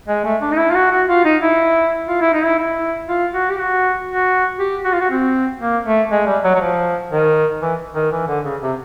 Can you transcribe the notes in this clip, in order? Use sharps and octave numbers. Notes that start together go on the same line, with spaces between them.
G#3
A3
D4
D#4
E4
F4
F#4
F#4
F4
D#4
E4
F4
E4
D#4
E4
E4
F4
F#4
G4
F#4
F#4
G4
F#4
F4
F#4
C4
A#3
A3
G#3
G3
F#3
F#3
F3
D#3
E3
D#3
E3
D3
C#3
C3